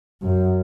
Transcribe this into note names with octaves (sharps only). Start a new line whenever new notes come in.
F#2